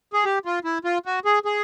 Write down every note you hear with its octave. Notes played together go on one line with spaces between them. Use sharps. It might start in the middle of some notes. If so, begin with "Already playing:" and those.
G#4
G4
F4
E4
F4
F#4
G#4
G#4